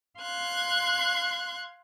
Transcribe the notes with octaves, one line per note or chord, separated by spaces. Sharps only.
F5 C6 F#6 G#6